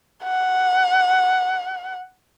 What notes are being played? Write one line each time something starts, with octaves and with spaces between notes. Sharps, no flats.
F#5